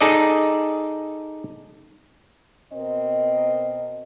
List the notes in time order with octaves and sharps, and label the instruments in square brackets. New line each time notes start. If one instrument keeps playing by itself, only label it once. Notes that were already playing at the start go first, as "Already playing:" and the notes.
[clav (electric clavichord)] D#4 G#4 A4 D5 D#5
[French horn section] B2 C4 A#4 D#5